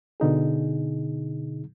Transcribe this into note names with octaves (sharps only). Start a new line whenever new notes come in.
B2 D3 D#4 G#4